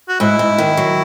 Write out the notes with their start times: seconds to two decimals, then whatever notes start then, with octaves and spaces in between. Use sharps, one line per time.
0.09 F#4
0.20 G#2 E4
0.39 G#2
0.58 D#3
0.77 F#3